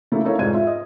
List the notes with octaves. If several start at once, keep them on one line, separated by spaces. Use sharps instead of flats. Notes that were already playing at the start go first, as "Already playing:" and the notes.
C#3 A3 A#3 E4
D#4 E4 A4 A#4 C#5 F5
F1 G#2 F4 D5 G#6 D#7
F4 E5
D#5